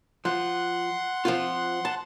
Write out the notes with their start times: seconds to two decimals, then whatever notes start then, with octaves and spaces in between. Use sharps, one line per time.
0.25 F3 F#5 C6 F#6
1.25 F3 C4 F4
1.85 A5